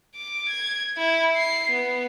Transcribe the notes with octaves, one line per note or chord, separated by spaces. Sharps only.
D6
G#6
E4
C7
B3